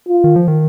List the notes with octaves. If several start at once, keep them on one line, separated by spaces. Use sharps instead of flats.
F4
D#3
F3
D#3